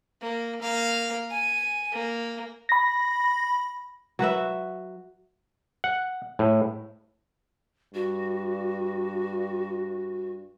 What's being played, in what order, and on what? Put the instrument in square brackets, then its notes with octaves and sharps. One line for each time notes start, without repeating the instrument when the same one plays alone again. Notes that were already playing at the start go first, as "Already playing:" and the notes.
[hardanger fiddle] A#3
A#3 F5
G#5
A#3
[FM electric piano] B5 A#6
[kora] F#3 F#4 B4 E5
[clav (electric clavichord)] F#5
A2
[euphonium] G2 [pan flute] F#4